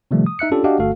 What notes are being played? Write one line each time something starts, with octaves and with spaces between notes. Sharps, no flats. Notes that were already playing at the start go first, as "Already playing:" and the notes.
C3 D#3 F3 G3 A3
D#6
D#4 E5 F#6 C#7
C#4 D4 F4 G4 A4
D4 F#4 G4 D#5 F5 F#5
G1 A3 F#4 A4 F5